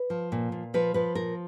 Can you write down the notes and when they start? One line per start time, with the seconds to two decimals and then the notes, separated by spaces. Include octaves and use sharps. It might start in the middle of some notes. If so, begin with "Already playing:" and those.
Already playing: B4
0.10 F3
0.32 A#2
0.52 A#2
0.74 F3 B4
0.94 F3 B4
1.15 A#2 A#4